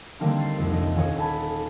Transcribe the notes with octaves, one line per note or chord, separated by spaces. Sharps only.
D3 D#3 G3 A#3 C4 D4
A6 C7
C2 F2
F1 D#5 D7
D#1 D#2 G#5 C#6 D#6 E7
A4 G#5 A5 B5